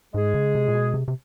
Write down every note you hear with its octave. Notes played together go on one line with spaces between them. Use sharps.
G#2 G#3 G#4
C#3
C3
A#2
B2
C3
C3